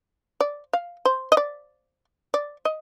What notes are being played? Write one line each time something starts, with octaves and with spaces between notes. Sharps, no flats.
D5
F5
C5
D#5
D5
D5
D#5